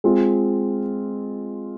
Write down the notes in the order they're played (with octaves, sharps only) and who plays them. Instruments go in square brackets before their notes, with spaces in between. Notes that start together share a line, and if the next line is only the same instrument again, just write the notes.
[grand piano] G#3 C4 F4